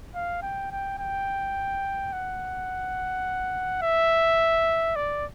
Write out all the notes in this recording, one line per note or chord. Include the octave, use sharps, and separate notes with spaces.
F5
G5
G5
G5
F#5
E5
D5